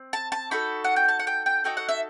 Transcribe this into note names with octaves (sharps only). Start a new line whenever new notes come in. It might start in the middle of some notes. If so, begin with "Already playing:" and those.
Already playing: C4
A5
A5
D#4 F#4 A4 B5
F#5
G5
A5
F#5
G5
G5
D#4 F#4 A4 G5
F#5
E5